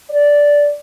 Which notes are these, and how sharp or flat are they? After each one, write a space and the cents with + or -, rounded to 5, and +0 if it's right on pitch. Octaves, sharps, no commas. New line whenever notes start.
D5 -10